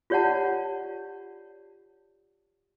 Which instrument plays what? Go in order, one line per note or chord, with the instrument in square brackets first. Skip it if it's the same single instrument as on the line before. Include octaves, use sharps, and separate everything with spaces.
[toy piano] F4 G4 C#5 D5 F#5 A5